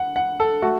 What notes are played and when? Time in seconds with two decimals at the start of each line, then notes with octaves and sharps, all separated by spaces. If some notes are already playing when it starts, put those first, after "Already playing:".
Already playing: F#5
0.16 F#5
0.40 A4
0.62 A3 F#4